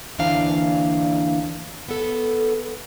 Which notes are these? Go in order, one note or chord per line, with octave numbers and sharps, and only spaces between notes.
D2 E3 A#3 D4 F5 A#5
B3 A4